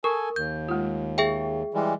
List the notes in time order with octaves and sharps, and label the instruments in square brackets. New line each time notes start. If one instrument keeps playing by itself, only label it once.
[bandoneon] A4 G#5 [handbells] A#4 [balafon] C#6
[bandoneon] D#2 [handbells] G6
[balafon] G#3 A3 F4
[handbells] G#4 E5 G5
[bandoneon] E3 G3 G#3